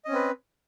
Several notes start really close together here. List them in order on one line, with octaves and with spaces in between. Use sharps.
D#5 C#4 C4 B4